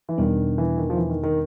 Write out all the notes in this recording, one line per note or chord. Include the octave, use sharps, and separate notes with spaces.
E3
E2 B2 D#3 G3 B3 D4
E3
D#3
F3
E3
D#3
D#3